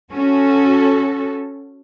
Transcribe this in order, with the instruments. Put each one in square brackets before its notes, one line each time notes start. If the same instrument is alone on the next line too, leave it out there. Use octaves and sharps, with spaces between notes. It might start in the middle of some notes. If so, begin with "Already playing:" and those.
[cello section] C#4 F#4 A4